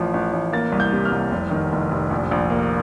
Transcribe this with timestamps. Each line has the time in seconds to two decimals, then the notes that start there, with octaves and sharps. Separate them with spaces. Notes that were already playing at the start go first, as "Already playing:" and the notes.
Already playing: A1 F3
0.14 A1
0.33 A1
0.53 A#3 A6
0.72 C2
0.80 G6
0.93 C3
1.05 F6
1.12 C2
1.31 F1
1.51 D#3
1.72 F1
1.91 F1
2.11 A#1
2.31 A#1
2.50 A#3